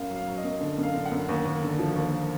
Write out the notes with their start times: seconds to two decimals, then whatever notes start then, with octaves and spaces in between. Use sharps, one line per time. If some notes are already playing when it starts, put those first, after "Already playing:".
Already playing: F#2 F5
0.10 F#3
0.16 F5
0.27 F#3
0.38 D#5
0.44 F#2
0.61 D3
0.78 F#2
0.83 F5
0.95 D3
1.05 F#5
1.11 F#2
1.29 D#2
1.45 D#2
1.62 D3
1.79 F3
1.96 D#2